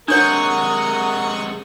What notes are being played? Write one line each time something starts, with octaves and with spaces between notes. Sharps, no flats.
C3 G#3 D4 A#4 C#5 F#5 C#6 D#6